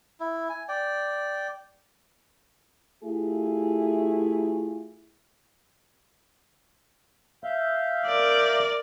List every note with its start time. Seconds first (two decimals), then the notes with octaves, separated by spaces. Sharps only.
0.20 E4
0.49 G#5
0.68 D5 G5
3.03 A3 E4 F4 G4 G#4
7.44 E5 F5 G6
8.06 A#4 D5